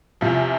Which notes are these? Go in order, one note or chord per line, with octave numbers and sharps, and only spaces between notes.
E2 C3 F3